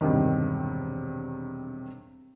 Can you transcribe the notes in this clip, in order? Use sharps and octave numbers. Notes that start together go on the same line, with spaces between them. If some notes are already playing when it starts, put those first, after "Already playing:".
E1 G2 C3 D#3